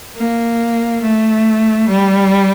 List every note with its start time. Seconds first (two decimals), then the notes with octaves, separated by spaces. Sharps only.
0.16 A#3
1.01 A3
1.88 G3